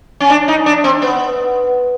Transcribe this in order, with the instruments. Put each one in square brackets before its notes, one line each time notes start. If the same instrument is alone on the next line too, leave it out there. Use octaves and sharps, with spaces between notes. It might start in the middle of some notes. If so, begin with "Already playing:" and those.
[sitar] C#4
D4
D#4
D4
C4
B3